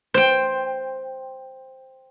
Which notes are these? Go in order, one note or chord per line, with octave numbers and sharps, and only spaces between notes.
C5 G5